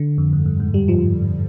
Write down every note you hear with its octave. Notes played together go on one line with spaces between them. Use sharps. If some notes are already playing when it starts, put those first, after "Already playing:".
Already playing: D3
F2
G2
G2
G#2
G3
F3